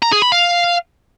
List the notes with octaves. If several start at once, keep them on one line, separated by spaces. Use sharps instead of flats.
A#5
G#4
B5
F5